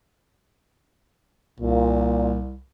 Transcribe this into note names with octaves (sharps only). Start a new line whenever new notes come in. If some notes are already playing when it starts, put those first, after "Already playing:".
C2 A#2